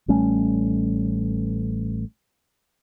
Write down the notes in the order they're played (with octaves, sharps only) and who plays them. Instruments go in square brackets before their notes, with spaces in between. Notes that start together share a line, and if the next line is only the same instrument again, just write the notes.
[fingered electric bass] A1 G3 A3 C#4